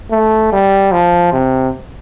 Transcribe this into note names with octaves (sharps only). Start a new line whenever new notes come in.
A3
G3
F3
C3